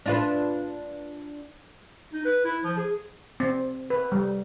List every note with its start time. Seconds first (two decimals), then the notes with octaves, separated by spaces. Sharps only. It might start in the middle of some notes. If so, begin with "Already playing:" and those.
0.06 D4 F4 B4
2.13 D#4
2.25 B4
2.44 E4
2.64 F3
2.77 G#4
3.40 C4
3.90 B4
4.12 G3